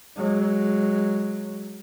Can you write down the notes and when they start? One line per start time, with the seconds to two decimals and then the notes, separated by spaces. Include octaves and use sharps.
0.17 F#3 G#3